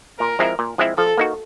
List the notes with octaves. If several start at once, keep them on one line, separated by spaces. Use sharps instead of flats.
A#2 A#4
F3 G#3 C4 E4
A#2
F3 G#3 C4 E4
F3 A4
A#3 D#4 F#4